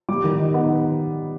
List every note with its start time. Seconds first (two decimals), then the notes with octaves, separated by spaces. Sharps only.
0.09 G3 D6
0.24 D#3
0.39 D#4
0.54 B3